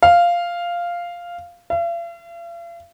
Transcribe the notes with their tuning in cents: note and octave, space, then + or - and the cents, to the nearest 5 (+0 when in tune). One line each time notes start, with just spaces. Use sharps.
F5 -5
F5 -45